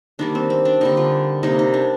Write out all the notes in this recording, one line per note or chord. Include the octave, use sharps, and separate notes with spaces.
D#3 G3 A#3 D4
C4
C4
D4
D3 G3 A#3 D#4
F4
C3 G3 A#3 D#4
D#4
D4